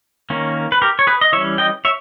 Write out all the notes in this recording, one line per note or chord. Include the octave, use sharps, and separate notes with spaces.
D#3 A#3 C#4
B4
G4 A#4
C#5
G#4 B4
D#5
E3 G3 C#4 C#5 E5
D#5 G5
C#5 E5